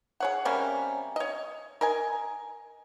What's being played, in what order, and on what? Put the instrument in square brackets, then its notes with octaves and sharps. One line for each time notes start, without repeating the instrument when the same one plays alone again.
[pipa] G#4 C#5 F#5
C3 G3 A#3 C#4
C#5 D#5
A#4 D#5 G#5